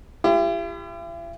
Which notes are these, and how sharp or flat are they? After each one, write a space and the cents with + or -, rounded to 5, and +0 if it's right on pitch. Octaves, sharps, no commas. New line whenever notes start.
E4 +45 G4 +15